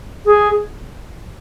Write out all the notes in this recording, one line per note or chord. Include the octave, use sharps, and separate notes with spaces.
G#4